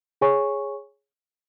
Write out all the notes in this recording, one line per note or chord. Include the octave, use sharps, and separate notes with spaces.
G#4 C#5 G#5 C#6